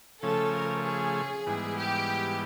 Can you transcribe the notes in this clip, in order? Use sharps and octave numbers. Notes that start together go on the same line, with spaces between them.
C#3 F3 A3 C#4 A4
A#4
G#4
G#2 E3 G3 B3
G4